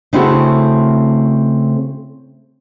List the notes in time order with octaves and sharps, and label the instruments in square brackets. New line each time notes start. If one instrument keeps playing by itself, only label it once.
[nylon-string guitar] C#3 A3 C4 E4 F#4 A4